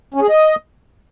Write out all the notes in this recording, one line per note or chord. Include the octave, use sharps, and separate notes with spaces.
C#4
G#4
D#5